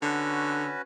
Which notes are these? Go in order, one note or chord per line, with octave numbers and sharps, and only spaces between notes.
D3 C#4 F#4 B4